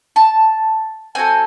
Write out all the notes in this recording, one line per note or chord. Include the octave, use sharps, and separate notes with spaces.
A5
C4 D#4 F#4 A4 G#5